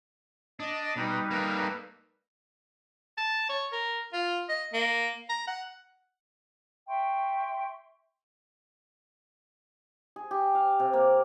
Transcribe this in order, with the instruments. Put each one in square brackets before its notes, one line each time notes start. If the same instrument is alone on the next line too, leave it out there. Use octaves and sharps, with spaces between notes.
[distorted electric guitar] D4 [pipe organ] D#5
[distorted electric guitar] B2 [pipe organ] G3 D#4 B4
[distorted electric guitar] A#3 A4
[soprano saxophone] A5
C#5
A#4
F4
D#5
A#3
A#5
F#5
[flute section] E5 G5 C6 C#6
[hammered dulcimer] G#4
G4
F5
C3
A#3